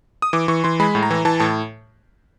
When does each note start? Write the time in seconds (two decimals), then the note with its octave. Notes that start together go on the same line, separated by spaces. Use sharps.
0.22 D#6
0.33 E3 D6
0.48 E3 C#6
0.64 E3 C6
0.80 G#3 B5
0.95 A2
1.03 A#5
1.11 E3
1.25 E3 A5
1.40 A2 A5